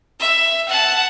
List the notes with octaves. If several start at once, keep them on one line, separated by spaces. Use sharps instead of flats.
E5
F#5 A5